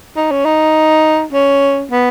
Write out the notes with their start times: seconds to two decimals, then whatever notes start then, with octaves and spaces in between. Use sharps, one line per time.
0.16 D#4
0.32 C#4
0.45 D#4
1.33 C#4
1.91 B3